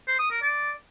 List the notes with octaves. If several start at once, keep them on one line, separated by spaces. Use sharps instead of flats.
C5
D#6
A#4
D5